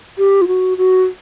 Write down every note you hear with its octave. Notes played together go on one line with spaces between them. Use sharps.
G4
F4
F#4
F#4